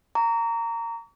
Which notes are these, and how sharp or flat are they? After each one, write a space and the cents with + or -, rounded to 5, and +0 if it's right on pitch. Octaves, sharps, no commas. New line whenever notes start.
A#5 -15 C#6 +45